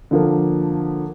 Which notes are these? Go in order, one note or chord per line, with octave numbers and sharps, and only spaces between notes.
D3 F3 A#3